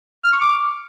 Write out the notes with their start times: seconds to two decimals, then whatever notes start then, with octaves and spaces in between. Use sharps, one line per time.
0.24 F6
0.32 C#6
0.41 D6